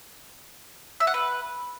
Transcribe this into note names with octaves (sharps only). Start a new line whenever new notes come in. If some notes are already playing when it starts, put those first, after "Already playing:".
E5
F#5
B4